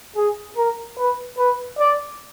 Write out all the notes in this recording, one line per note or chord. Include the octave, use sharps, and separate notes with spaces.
G#4
A#4
B4
B4
D5